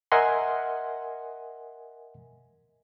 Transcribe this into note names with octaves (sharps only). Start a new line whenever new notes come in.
A#4 D#5 E5 F#5 G#5 C6